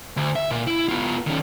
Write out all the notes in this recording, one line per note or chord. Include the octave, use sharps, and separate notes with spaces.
D2
E5
A#2
E4
B3 F4
D#3 C#4